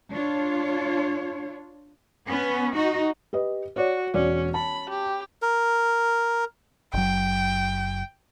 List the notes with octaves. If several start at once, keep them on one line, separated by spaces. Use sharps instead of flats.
D4 F4 C#5
B3 C#4
D#4 F#4
G4 B4 D#5
F#4 C#5 D5
E1 C#4 F#4 D5
A5 B5
G4
A#4
F#1 F#3 G5